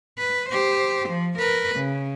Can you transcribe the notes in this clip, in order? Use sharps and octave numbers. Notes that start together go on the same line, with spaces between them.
B4
G4 C5
F3
A#4 B4
C#3